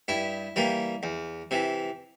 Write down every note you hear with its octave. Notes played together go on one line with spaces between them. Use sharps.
G2 E4
E3 G3 A#3
E2
C3 E3